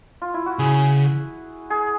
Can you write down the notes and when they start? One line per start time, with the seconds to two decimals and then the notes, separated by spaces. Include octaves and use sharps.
0.22 F4
0.34 E4
0.46 F#4
0.59 C#3 G#4
1.70 G#4